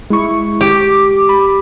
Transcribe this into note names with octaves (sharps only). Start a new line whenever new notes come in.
G#3 E4 C#6
G4 D6
B5